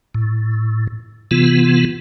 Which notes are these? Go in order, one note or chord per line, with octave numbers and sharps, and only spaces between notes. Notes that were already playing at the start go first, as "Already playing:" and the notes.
A2
C3 E3 B3 F4